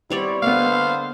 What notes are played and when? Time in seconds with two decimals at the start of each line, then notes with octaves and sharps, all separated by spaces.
0.10 G3 B3 C4 E4 C#5 D5
0.42 D3 A#3 B3 B4 C5 F5